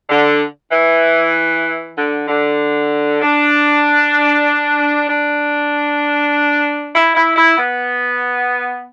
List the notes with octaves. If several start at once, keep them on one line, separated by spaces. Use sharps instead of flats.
D3
E3
D3
D3
D4
D4
E4
E4
E4
B3